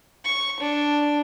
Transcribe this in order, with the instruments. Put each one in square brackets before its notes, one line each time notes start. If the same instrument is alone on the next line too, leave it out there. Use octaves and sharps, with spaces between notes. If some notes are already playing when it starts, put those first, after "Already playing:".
[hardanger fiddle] C#6
D4